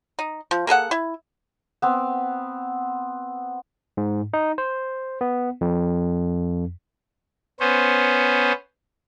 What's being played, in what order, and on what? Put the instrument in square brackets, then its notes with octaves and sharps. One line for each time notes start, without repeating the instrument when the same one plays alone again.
[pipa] D#4
F3
A#3 G#4 A4 F#5
E4
[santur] B3 C4
[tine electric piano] G#2
D#4
C5
B3
F2
[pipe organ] B3 C#4 C5